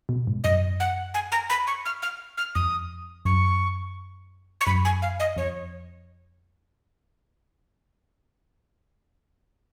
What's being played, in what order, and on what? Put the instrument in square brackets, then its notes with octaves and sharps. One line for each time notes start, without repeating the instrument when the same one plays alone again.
[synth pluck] B2
G#2
[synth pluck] F#2 [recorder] D#5
[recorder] F#5
G#5
A#5
B5
C#6
F6
F6
F6
[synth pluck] F2 [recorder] D#6
[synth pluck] F#2 [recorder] C#6
[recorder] C#6
[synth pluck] F#2 [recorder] B5
[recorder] G#5
F5
D#5
[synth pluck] F2 [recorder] C#5